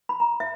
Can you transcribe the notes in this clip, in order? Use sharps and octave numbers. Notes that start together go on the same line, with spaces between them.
B5
A#5
E5